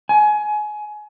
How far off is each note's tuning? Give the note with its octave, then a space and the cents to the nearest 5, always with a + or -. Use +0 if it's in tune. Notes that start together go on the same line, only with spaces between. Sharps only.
G#5 +25